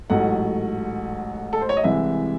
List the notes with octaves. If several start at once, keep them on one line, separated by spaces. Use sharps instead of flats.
A1 G#2 F#3 A3 F#5
A4
C5
C#5
D#5
C2 C3 E3 G#3 E5